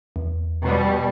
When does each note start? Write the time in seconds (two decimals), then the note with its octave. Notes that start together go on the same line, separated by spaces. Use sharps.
0.16 E2
0.62 B2 G3